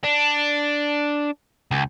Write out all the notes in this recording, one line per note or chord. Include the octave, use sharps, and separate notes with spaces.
D4
C#2